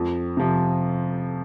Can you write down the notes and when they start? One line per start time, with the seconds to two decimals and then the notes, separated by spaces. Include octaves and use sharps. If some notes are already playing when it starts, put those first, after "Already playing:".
Already playing: F2
0.37 C3 F3